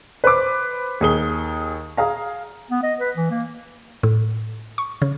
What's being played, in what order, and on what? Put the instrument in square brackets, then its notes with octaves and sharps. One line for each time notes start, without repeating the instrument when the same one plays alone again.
[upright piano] B4 C5 D6
D#2 G#4 G7
G#4 F5 A#5
[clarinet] B3
D#5
B4
E3
A#3
[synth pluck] A2
C#6
C#3